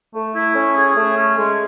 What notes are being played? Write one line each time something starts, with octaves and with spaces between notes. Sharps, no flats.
A3
E4
C#4
G#4
A3
C#4
G#3